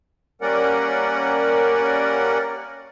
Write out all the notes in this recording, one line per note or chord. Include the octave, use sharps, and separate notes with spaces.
G3 A#3 C#4 A#4 D5 F#5